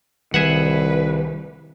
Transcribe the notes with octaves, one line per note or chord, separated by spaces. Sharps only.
C2 D#3 G3 G#4 B4 E5 F#5